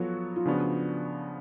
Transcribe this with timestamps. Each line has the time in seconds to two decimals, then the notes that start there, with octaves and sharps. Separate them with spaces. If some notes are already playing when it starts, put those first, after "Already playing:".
Already playing: F3 F#3 B3 F#4 A4 C#5
0.36 F4
0.45 C#3 F3 B3 D4 F#4